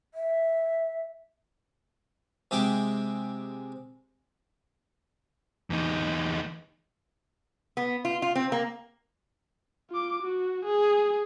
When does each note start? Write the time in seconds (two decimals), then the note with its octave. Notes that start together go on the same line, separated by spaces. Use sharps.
0.14 E5
2.51 C3 G#3 G4 D6
5.70 E2 D#4
7.77 B3
8.05 F4
8.22 F4
8.35 C4
8.52 A#3
9.90 F4 D6
10.22 F#4
10.65 G#4